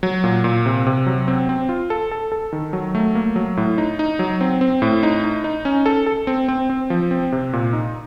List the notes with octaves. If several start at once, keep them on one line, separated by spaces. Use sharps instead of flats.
F#3
A#2
A#2
C3
C3
F#3
C4
C4
F4
A4
A4
A4
D#3
F#3
A3
A#3
F#3
A2
D#4
D#4
F#3
C4
C4
A2
D#4
D#4
D#4
C#4
A4
A4
C4
C4
C4
F3
C4
C3
A#2
D#4